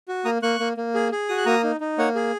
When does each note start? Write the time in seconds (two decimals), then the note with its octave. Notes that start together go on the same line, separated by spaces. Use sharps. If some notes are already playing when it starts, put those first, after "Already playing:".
0.08 F#4
0.25 A#3 A#5 D#6
0.42 A#3 C#6 F#6
0.60 A#3
0.77 A#3
0.94 G#4
1.12 G#4
1.29 F#4 D#6
1.37 F#6
1.46 A#3 A#5 D#6
1.64 D#4
1.81 D#4
1.98 A#3 C#5 F#5
2.15 G#4